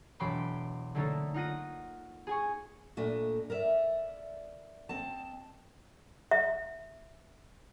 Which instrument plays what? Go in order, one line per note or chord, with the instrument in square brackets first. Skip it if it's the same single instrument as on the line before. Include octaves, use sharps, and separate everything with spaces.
[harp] E1 F#3 G5 B5 C6 D6
D3 F#3 A3 A#3 D#4 A4
D#4 F4 F#5 A#6 D#7
G#4 G#5 C#6
[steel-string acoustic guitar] A#2 A3 D4 D#5
A#4 D5 E5
C4 D#5 A5
[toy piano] E5